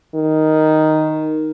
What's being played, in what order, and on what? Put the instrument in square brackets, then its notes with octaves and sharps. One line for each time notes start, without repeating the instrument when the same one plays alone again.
[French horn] D#3